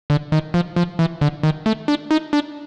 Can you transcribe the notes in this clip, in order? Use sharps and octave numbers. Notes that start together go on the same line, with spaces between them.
D3
D#3
F3
F3
E3
D3
D#3
A3
D4
D#4
D4